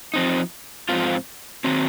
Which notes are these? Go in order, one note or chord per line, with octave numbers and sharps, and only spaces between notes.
F3 C4 D#4
G#2 F3 C4 F4
D#3 F#3 C4